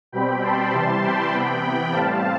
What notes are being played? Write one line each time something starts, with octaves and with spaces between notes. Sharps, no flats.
B2 G3 C4 G5 B5
A5 C6
C3 E3 G3 A5 C6
G5 B5
C3 E3 B3
A2 G3 C4 F5 A5